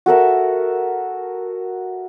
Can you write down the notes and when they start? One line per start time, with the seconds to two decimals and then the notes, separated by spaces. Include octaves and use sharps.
0.06 F#4 A4 A#4 E5